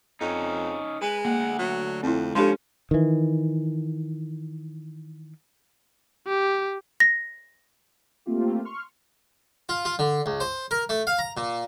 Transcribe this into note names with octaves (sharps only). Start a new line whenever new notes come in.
F2 C#4 D#4
G#3 B4
D2 A#3 F#5
F#3
F2 C4 E4
F3 G#3 C#4 D4 G4 A4 C6
D#3 E3
G4
A#6
A3 A#3 C4 F4 G4
C6 C#6 F6
F4
F4
D3
C#2
C5
A#4
A3
F5
A#5
A#2